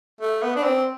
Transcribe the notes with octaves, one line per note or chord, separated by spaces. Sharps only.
A3
B3
D4
C4